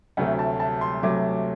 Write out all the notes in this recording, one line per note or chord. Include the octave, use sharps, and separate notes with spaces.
D2 C3 F#3 A3 F#5
A5
A5
C6
D2 C3 F#3 A3 D6